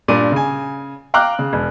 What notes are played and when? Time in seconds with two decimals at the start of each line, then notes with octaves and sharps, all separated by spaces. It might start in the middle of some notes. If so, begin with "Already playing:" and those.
0.08 G2 A#2 D4 D5 D#7
0.32 C#3 G#5
1.14 F5 G5 A#5 D6 F6 F#6
1.39 C#3
1.53 E1